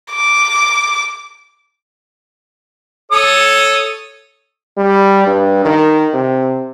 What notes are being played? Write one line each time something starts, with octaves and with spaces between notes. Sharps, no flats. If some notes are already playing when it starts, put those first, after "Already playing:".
D6
A4 C#5 D#6
G3
G2
D#3
C3